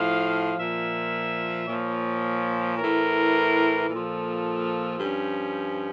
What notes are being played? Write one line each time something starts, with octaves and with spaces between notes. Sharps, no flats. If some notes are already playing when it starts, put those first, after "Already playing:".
Already playing: A2 F3 F5
A#2 F3 E5
A#2 F3 C#5
A2 E3 A#4
A#2 F3 A4
G2 F3 C#4